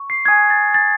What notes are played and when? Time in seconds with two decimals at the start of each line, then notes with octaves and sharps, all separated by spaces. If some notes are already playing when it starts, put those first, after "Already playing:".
Already playing: C#6
0.10 C7
0.25 G#5 D#6 F#6 G#6
0.50 A6
0.74 A6